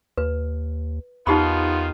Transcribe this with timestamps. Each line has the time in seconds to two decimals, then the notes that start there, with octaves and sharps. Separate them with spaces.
0.18 D#2 B4
1.27 E2 D#3 B3 D#4 F4 G4 B5